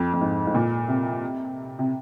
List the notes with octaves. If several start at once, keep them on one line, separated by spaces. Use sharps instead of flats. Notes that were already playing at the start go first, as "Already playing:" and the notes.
Already playing: F2
F2
G#2
G#2
A#2
C3
C3